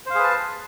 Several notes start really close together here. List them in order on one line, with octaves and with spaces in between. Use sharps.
C5 F5 G#4 B4 A5